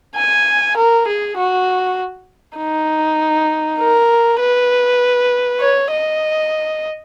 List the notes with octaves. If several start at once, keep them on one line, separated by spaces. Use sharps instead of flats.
G#5
A#4
G#4
F#4
D#4
A#4
B4
C#5
D#5